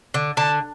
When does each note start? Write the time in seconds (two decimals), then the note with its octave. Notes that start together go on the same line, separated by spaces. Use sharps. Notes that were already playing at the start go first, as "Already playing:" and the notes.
0.14 D3
0.37 D3 A5